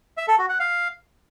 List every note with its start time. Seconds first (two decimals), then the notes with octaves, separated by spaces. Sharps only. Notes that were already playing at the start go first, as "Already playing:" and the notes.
0.17 E5
0.28 A4
0.39 F#4
0.49 F#5
0.60 F5